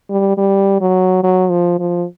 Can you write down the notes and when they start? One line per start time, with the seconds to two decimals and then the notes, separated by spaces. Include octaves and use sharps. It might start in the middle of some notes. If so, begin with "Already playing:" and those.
0.10 G3
0.38 G3
0.81 F#3
1.23 F#3
1.50 F3
1.80 F3